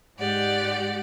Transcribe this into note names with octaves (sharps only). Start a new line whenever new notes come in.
G#2 G#3 G4 D5 F#5